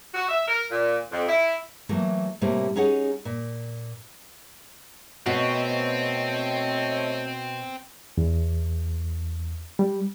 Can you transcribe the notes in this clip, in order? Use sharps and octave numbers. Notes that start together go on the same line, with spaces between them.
F#4
E5
A#4
A#2
F2
E4
E3 F#3 A3 A#3
A2 C3 G3 A#3
C#4 D#4 G#4 C#5 F#5
A#2
B2 A3 C4 F#4 C#5 D#5
E2
G3